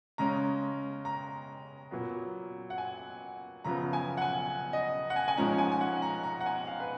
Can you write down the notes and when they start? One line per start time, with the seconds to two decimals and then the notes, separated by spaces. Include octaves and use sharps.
0.18 C#3 G#3 C#4 A#5
1.05 A#5
1.91 A#2 F#3 B3
2.70 F#5
2.78 G#5
3.64 F#2 C#3 F3 B3 A#5
3.93 G#5
4.17 F#5
4.21 G#5
4.73 D#5
5.10 F#5
5.16 G#5
5.28 G#5
5.37 G#2 F3 G#3 C#4 A#5
5.58 G#5
5.72 G#5
5.81 F#5
6.02 A#5
6.23 A#5
6.40 F#5
6.46 G#5
6.67 F5
6.80 B4